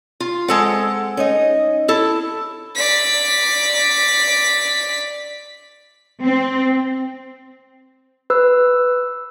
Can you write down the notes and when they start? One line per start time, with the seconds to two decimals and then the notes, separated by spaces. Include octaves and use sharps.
0.20 F4
0.48 G#3 C4 A4 F#5
1.17 C#4 D#4 D#5
1.88 E4 A4
2.75 D5 B6
6.22 C4
8.30 B4 E6